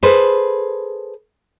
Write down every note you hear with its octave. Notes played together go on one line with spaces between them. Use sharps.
G#4 A4 B4 C5